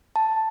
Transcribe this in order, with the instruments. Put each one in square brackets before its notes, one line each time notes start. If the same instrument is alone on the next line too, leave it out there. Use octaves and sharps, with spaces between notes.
[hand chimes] A5